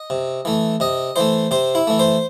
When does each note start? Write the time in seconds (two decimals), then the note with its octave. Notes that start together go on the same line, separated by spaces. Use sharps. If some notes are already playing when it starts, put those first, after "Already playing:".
Already playing: D#5
0.10 C3
0.45 E3 A3
0.80 C3 D#5
1.16 E3 A3 C5
1.51 C3 C5
1.75 E4
1.87 E3 A3
1.99 C5